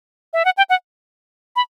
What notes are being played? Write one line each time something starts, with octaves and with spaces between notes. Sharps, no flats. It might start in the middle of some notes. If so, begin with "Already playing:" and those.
E5
F#5
G5
F#5
B5